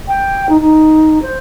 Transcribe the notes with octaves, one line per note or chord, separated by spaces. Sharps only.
G5
D#4
D#4
C5